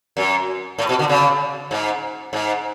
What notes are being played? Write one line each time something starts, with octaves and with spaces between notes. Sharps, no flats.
F#2
A2
B2
D3
C#3
G#2
G#2